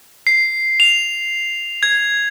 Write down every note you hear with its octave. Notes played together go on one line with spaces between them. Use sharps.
C7
F7
G#6